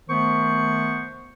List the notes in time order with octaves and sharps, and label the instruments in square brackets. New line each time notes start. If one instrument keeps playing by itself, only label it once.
[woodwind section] D#3 A3 B3 C5 C#6